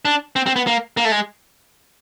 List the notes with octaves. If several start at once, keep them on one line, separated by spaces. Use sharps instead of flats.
D4
C4
C4
B3
A#3
A#3
A3
G#3